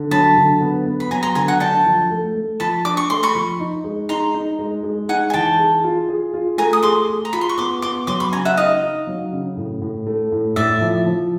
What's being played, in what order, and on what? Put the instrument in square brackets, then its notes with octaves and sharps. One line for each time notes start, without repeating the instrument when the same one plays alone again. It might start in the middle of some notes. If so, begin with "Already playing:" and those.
Already playing: [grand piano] D3
[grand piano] F#3 [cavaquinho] A5 B5
[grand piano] D3
B3
B3
[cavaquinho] B5
[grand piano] F#3 [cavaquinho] G#5 A#5
[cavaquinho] A#5 C6
[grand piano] D3 [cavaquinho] G#5 A#5
[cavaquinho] F#5 G#5
[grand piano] D4 [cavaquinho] G5 A5
[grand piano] F3
A3
A3
[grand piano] F3 [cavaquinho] A5 B5
[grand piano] D4 [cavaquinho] D6
[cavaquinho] C#6
[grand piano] A3 [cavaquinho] C6
[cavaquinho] B5 C#6
[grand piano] F3
D#4
G#3
[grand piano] D#4 [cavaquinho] A#5 C6
[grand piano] D#4
G#3
G#3
[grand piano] D#4 [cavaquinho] F#5 G#5
[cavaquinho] G#5
[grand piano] E3 [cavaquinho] G5 A5
[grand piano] G#4
F4
G#4
F4
[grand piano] A3 [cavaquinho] G#5 A#5
[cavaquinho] D#6
[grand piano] G#4 [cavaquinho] C6 D6
[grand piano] G#4
[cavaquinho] A#5
[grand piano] F4 [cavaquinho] B5
[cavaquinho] C6
C#6
[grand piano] B3 [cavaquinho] C6 D6
[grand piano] B3 [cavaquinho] C6 D6
[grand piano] F#3 [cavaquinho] C6 D6
[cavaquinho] B5 C#6
[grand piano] C#3 [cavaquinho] G#5 A#5
[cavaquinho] E5 F#5
[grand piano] D#4 [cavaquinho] D#5 F5
[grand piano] D#4
F#3
C#3
A2
A2
A3
A2
[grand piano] A2 [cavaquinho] D5 E5
[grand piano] F3
F3